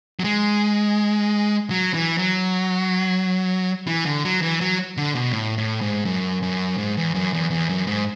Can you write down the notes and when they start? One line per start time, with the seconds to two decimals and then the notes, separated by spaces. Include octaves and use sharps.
0.20 F#3
0.24 G#3
1.70 F#3
1.94 E3
2.18 F#3
3.87 E3
4.06 D3
4.24 F#3
4.42 E3
4.61 F#3
4.97 D3
5.15 B2
5.32 A2
5.58 A2
5.81 G#2
6.05 F#2
6.43 F#2
6.78 G#2
6.97 E2
7.15 F#2
7.33 E2
7.50 E2
7.69 F#2
7.87 G#2